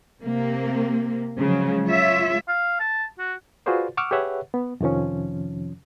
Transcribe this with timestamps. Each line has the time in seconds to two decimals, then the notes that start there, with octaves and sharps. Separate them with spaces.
0.24 C3 A#3
1.40 C#3 F3 F#3 G#3
1.87 G#3 F4 C#5 E5
2.48 F5
2.80 A5
3.19 F#4
3.66 F4 F#4 G#4 B4 C5 D5
3.97 F#5 C#6 D6 E6 F6
4.11 G4 G#4 B4 C#5 E5 F#5
4.54 B3
4.81 F2 C3 D#3 F3 C#4